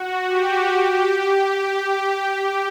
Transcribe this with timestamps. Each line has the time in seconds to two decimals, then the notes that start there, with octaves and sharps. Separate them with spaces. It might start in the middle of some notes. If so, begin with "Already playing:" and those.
Already playing: F#4
0.27 G4
1.16 G4